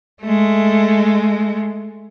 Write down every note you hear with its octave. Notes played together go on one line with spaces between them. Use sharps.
G#3 A3